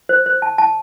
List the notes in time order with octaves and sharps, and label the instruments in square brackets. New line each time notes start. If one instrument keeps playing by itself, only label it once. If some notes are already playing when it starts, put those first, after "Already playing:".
[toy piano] C5
C5
A5
A5